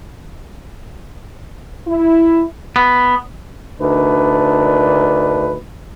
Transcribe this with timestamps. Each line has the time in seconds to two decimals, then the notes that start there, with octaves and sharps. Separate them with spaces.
1.87 E4
2.76 B3
3.81 D2 D4 D#4 A#4 B4